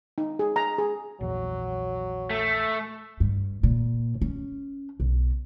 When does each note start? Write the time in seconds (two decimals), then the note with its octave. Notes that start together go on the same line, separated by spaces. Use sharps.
0.18 D#4
0.39 G#4
0.56 A#5
0.78 G#4
1.21 A#1 E2 F#3
2.30 A3
3.20 G2
3.63 A#2
4.22 C#4
5.00 B1